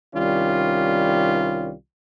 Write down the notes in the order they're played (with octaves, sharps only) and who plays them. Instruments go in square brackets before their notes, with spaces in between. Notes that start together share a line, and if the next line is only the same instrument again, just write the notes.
[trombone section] C2 D#3 G3 C#4 F4